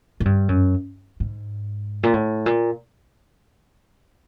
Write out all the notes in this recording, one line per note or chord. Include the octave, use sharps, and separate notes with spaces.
G#2
G2
F#2
G#2
A#2
A2
A#2